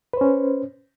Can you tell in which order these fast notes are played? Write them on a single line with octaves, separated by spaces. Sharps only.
B4 C5 C#4